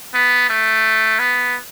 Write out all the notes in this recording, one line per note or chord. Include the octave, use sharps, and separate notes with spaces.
B3
A3
B3